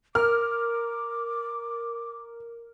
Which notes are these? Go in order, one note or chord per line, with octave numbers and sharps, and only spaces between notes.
A#4 D6 F6